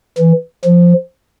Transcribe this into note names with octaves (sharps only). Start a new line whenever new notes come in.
E3
F3